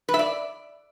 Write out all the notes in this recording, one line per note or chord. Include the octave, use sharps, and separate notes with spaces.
B4
E5
D5